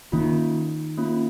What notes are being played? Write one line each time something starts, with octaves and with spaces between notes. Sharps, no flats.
D#3 A#3 C#4 F4
A#3 C#4 F4